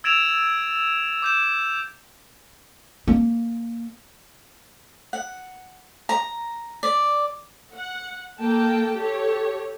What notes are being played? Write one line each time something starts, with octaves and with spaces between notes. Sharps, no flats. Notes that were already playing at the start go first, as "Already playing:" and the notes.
E6 G#6 A6 D7 E7 F7
D6 G6 E7
A#3
F#5
A#5
D5
F#5
A#3 A4 G5 A5
G4 A4 C#5